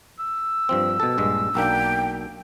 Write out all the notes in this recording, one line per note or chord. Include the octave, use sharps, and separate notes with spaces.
E6
G2 F3 C4
B2 A4
A#1 G2 G#3
B1 A#3 D4 G5